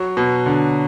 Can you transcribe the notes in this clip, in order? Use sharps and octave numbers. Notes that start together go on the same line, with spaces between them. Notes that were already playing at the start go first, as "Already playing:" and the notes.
Already playing: F#3
B2
D3